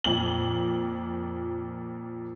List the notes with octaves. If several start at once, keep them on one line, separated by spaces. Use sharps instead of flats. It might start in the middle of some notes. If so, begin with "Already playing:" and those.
F2 A#2 F#7